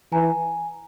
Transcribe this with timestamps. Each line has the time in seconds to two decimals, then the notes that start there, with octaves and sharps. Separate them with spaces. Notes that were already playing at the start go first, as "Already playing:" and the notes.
0.12 E3 G#5 A#5